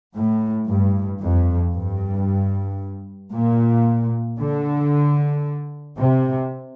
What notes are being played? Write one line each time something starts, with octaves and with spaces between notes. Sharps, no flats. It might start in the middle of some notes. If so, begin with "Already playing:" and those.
A2
G2
F2
G2
A#2
D3
C3